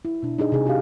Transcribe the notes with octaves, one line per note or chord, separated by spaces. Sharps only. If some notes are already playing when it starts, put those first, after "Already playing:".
E4
B2 D4
D4 D#4 G#4 D#5
C3 G#4
D4 F#4 G4 F5